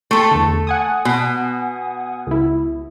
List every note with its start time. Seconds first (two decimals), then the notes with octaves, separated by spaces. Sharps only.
0.11 A3 A4 G5 C6 C#6
0.31 E2 D3
0.67 F#5 G#5 D#6
1.05 B2
2.27 C#2 E4